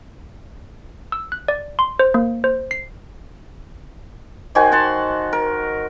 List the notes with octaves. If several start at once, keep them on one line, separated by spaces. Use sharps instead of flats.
E6
F#6
D5
C6
C5
A#3
C5
C7
D#3 F#4 C5 G#5
F#5 A5 C6
A#4